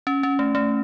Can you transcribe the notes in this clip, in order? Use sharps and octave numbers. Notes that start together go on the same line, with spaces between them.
C#4
C#4
A3
A3